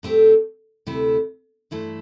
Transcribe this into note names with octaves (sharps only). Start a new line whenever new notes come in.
A2 A3 C4 G4
D2 C3 A3 E4
G2 E3 A3 E4 C5